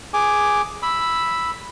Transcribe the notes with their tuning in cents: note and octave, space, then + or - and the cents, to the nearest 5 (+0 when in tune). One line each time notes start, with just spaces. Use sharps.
G#4 +0 G#5 +0 D6 +0
B5 +0 E6 +0